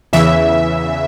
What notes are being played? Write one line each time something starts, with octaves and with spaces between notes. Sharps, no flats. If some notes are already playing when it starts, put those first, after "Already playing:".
E2 C#3 E3 E5